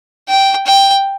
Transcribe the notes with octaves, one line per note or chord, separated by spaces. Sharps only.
G5
G5